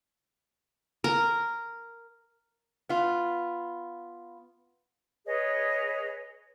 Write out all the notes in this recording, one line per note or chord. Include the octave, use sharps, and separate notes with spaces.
A#4
B3 F4
G#4 B4 C#5 D#5